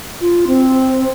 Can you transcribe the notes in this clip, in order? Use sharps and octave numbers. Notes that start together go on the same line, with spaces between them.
F4
C4